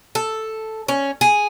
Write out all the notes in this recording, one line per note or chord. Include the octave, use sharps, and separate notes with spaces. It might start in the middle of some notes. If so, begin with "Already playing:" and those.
A4
C#4
G#4